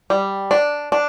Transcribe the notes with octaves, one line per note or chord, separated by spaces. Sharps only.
G3
D4
D4